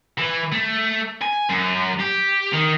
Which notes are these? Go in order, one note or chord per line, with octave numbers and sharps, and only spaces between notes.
E3
A3
G#5
F#2
G4
D#3